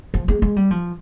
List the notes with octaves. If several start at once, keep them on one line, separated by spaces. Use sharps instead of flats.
F3
G#3
G#3
G3
F3